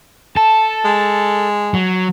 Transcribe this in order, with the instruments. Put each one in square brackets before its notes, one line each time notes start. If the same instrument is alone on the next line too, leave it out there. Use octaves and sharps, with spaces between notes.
[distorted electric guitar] A4 [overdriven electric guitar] A5
[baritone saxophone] G#3
[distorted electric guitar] F#3